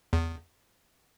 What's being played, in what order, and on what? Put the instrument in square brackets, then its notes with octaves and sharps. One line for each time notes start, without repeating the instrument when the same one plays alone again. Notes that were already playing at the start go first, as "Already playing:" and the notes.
[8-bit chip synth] E2